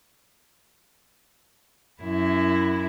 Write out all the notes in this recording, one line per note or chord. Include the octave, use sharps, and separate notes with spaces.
F#2 E4